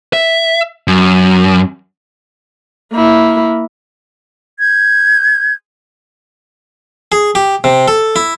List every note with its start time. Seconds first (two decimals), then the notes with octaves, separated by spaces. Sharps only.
0.13 E5
0.88 F#2
2.93 A#3 E4
4.59 G6 G#6
7.12 G#4
7.35 G4
7.64 C3
7.88 A4
8.16 E4